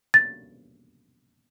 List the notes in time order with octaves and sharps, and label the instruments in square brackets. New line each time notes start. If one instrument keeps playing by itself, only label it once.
[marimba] A6